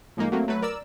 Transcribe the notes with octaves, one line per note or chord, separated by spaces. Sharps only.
A2 F3 G#3 A#3 D#4
F#3 A3 A#3 C4
F#3 A3 B4
A#4 D5 E6